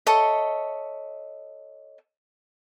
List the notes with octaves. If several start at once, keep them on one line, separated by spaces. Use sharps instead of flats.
A4 C#5 D#5 E5